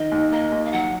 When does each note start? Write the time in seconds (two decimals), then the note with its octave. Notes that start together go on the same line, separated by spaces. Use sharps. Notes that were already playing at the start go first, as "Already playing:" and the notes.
Already playing: D#3 D#5
0.12 D#2
0.32 A#3 D#5
0.52 D#2
0.65 F5
0.72 F#3 F#5